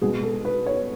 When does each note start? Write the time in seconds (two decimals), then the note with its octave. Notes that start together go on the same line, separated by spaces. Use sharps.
0.02 B2 G#3 B3 G#4
0.23 A4
0.45 B4
0.66 C#5